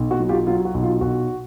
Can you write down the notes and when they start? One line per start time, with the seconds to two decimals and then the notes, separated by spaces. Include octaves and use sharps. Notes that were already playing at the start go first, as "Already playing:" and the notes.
Already playing: B1
0.11 F#4
0.20 F#3
0.29 F4 G4
0.47 F#3 F4
0.65 F#4
0.74 B1
0.83 F4
1.01 B1 F#4